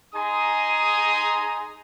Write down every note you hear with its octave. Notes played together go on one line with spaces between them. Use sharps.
D#4 G#4 G#5 A#5 C6 D#6